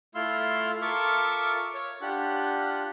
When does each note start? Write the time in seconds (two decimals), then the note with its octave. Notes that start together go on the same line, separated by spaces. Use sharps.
0.15 A3 E4 F4 F5 C6 E6
0.82 F4 A4 A#4 E5 C#6 D6
1.74 C#5
2.02 D4 F4 G4 F#5 F#6